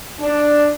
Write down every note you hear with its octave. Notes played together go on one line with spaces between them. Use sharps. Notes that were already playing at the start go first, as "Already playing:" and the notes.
D4